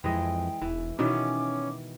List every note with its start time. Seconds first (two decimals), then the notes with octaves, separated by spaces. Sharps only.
0.04 F2 E3 G#3 D#5 G5
0.62 E1 E3
0.99 B2 D#3 E3 C#4 D6